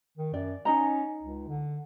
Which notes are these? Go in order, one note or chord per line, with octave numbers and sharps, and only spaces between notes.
D#3
F#2 D5
C#4 D#4 D#5 A#5
C#2
D3